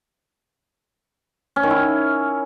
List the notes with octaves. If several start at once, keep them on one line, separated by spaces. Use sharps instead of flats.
C#4
D#3
E4